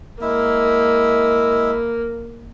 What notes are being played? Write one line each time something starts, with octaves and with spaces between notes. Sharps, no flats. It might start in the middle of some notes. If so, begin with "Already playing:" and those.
G#3 A#3 E4 E5